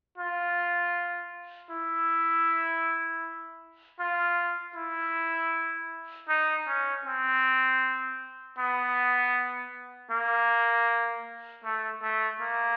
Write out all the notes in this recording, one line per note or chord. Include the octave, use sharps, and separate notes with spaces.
F4
E4
F4
E4
D#4
C#4
C4
B3
A#3
A3
A3
A#3